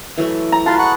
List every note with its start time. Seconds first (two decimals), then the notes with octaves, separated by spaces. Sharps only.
0.17 E3 F#3 A3
0.52 A#5
0.66 F4 F#4 B4 F5 A5 C6
0.79 G#4 F#5 C#6 F#6